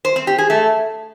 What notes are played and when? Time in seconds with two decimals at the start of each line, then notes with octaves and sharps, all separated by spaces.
0.05 C5
0.16 C4
0.27 G4
0.38 G#4
0.50 A3